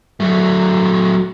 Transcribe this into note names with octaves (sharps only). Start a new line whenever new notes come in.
F#3 A3